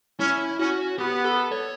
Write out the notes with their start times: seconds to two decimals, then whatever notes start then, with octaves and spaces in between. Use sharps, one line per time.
0.20 C#4 E4
0.59 C#4 F#4
0.98 B3 G4
1.24 A4
1.52 C#5